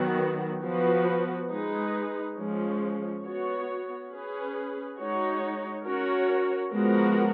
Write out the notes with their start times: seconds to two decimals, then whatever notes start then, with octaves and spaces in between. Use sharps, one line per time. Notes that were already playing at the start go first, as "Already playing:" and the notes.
Already playing: D#3 F#3 B3 F#4
0.62 F3 B3 F#4 B4
1.49 G#3 D#4 G#4 B4
2.36 F3 G#3 C#4
3.24 B3 F#4 C#5
4.10 C#4 G#4 B4
4.98 G#3 D#4 F#4 C#5
5.85 C#4 F#4 A#4 C#5
6.72 F3 G#3 B3 F#4 A#4